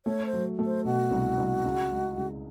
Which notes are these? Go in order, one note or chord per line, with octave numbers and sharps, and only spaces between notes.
A3 C#5
C5
F#3
A3
C5
B2 F#4
C2
C2
C#2
G#3
C#2